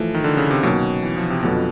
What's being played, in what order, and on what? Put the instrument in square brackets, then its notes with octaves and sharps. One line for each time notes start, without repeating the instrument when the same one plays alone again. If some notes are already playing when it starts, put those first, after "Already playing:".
Already playing: [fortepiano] A2 F3 A3 [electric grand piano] E3
[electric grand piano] D#3
D3
C#3
C3
[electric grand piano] B2 [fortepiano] D#3 F#3 A#3 C#4
[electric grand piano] E3
F3
C3
[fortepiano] F2 D3 F#3 B3 [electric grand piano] B2